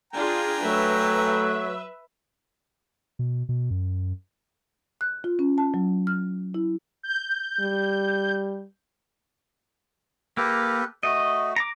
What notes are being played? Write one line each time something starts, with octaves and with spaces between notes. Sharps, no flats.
D4 F4 G#4 G5 G#5 A#5
F#3 A3 B4 E5
B2
B2
F#2
F#6
F4
C#4
A5
F#3
F6
E4
G6
G3
A#3 G4 A4 B4
A3 F#4 D#5
A#5 D6